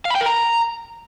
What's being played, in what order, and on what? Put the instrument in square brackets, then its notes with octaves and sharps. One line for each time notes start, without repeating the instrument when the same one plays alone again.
[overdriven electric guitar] F5
B5
G5
A#4
A#5